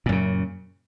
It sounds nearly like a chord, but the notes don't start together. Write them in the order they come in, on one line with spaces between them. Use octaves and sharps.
A#2 F#2 C#3